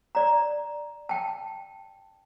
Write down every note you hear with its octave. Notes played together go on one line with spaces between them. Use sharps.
D5 A#5
G5 A5